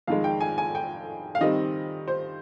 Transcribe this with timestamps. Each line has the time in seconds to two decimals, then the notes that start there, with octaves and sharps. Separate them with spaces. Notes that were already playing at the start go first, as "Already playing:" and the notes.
0.07 F2 D#3 G#3 F5
0.24 G5
0.41 G#5
0.58 G#5
0.75 G5
1.35 F5
1.41 D#3 G3 C4 D#5
2.08 C5